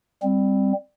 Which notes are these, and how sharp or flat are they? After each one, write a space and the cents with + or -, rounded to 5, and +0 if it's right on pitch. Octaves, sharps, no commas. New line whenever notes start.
G3 +15 C4 +0